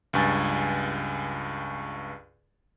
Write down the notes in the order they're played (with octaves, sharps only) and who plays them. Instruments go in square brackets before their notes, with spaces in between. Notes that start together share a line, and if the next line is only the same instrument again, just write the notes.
[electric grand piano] C#2 G2 G#5 A6